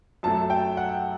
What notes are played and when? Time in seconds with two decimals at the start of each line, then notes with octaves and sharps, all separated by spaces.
0.23 F#2 F#3 A3 A5
0.50 G5
0.77 F#5